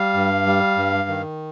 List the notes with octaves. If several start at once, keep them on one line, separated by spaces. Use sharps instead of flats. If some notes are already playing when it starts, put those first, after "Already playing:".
Already playing: G3 F5
G2
G3
G2
D#3